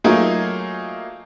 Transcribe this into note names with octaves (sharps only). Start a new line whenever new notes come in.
F#3 A3 A#3 D#4 F4 G#4